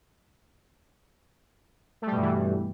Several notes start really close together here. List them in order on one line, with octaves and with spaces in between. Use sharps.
A3 G3 B2 G2 E3